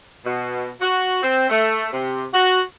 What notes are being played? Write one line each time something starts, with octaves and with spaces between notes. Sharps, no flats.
B2
F#4
C4
A3
C3
F#4